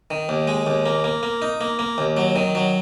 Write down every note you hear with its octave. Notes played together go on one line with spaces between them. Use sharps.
D#3
D#2
G#3
D#2
A#3
A#3
A#3
D#4
A#3
A#3
D#2
F#3
D#3
F#3